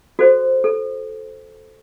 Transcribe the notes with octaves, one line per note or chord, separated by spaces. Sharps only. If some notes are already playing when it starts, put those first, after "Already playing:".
F#4 A4 C5
A4